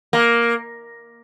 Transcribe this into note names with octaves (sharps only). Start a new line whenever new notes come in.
A#3